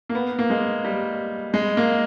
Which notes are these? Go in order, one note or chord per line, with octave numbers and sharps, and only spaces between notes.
A#3
B3
A#3
G#3
G3
G#3
A#3